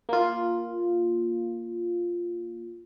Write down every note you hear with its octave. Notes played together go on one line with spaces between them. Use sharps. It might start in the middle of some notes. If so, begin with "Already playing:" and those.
A#3 F4